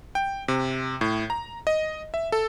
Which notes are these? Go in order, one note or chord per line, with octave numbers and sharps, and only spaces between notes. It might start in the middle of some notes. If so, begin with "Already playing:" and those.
G5
C3
A2
A#5
D#5
E5
A4